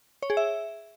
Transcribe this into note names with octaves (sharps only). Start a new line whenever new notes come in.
C#5
G#4
E5